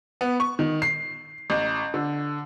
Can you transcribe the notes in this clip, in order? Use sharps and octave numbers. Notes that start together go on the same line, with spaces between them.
B3
C#6
D#3
C7
A1
D3